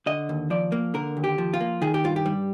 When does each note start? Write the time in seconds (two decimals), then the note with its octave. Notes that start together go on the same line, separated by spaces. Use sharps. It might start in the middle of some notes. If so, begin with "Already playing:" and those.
0.06 D3 D#5
0.29 D#2
0.50 F3 D5
0.72 A#3
0.94 D3 A#4
1.17 D#2
1.24 G4
1.38 F3
1.54 F4
1.61 A#3
1.82 D#3 G#4
1.94 G4
2.04 G2 F4
2.16 G4
2.26 G3